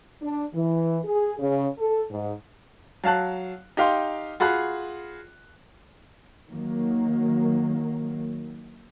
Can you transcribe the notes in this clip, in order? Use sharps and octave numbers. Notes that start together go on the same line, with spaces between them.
D4
E3
G#4
C#3
A4
G#2
F#3 F5 A5 F#6
D#4 G4 F5 G5 C6
F4 F#4 G#4 B5 F#6
D#3 F#3 A#3